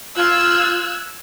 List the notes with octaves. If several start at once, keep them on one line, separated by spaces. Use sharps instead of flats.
F4 E6 F#6 G#6